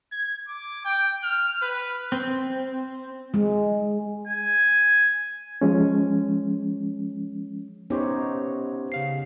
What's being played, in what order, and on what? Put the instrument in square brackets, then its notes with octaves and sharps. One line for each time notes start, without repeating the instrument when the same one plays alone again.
[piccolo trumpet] G#6
D6
G5
F6
B4
[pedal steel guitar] C4
[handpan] G#3
[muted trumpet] G#5
[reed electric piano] F3 G#3 C#4
[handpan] B3 D#4 C#5 [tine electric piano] C#4 G4 C5
[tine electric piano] C#3 F5 C7